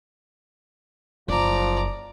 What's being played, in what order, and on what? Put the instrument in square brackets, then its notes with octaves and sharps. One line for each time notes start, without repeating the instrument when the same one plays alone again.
[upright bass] F#1 [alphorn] F3 [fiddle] D5 A#5